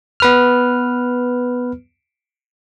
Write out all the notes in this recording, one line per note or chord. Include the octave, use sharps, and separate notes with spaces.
B3 B4 F6